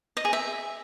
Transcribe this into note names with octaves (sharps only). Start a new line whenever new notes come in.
D#5
G#4
E5